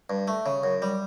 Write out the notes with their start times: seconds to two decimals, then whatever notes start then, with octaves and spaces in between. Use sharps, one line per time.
0.10 G2
0.28 A3
0.46 C#3
0.64 F#2
0.82 G3